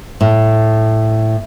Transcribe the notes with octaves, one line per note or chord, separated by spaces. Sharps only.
A2